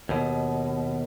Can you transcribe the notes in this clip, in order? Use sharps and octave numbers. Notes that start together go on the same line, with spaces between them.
D#2 B2